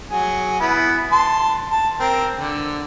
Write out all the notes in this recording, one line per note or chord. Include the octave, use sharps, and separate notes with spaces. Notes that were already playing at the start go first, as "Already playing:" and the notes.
F#3 G#4
B3 E4
A5 C6
A5
C4 A#4
D3